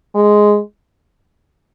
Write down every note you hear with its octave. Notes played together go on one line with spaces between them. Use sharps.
G#3